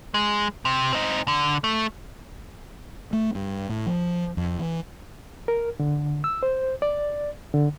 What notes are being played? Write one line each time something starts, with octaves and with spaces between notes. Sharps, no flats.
G#3
C3
C4 D#4
D3
A3
A3
G2
A2
F3
F2
E3
A#4
D3
E6
C5
D5
D3